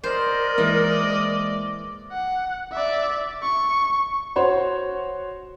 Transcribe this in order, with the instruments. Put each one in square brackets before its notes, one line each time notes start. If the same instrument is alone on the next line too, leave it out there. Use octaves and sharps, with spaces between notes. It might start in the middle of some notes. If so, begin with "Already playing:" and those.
[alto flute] A#4 [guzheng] C5 [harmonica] D5 D#5
[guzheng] E3 [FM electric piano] G#3 A#3
[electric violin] F#5
D5 E5
C#6
[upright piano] F#4 C5 C#5 C6